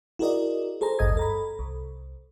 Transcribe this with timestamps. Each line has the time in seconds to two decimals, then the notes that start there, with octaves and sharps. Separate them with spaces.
0.19 E4 F#4 G#4 A#4 D5 D#5
0.81 G#4 A4 C5 A#5
0.99 G#1 D2 G2 D#5 D#6 G#6
1.17 A4 A#5 B5
1.59 C2